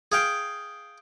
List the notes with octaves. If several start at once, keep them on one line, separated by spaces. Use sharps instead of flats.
G#4 F5 G5